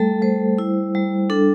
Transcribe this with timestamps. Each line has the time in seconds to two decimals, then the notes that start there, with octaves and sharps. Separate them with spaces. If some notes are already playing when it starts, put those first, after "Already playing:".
Already playing: G3 A3 A4
0.22 G3 C5
0.59 E4
0.95 G3
1.30 D4 A4